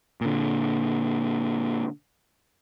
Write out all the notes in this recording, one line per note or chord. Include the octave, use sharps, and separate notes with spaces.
A#2 D3